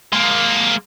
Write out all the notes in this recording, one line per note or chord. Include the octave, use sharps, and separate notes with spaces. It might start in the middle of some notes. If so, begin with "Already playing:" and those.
G#3 A#3